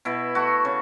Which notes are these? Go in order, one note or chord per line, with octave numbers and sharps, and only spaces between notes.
B2 E4
A3 F#4
C#3